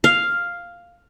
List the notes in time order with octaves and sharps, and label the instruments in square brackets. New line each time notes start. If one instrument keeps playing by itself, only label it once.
[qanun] F5